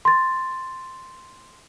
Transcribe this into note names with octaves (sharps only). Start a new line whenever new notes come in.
C6 A6